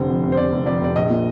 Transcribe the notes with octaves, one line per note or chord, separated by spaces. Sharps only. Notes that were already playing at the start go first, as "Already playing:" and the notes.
Already playing: F1 D3 C5
F2
F1
C5
F1 D5
F1
F2 D5
F1 D5
A#1 D#5
A#2